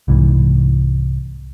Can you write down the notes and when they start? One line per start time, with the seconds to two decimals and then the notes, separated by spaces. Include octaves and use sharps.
0.08 C2 G#2 E3